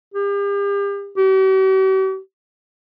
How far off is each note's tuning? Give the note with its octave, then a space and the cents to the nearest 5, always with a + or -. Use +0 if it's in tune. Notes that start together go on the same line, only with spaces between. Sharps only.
G4 +40
G4 -45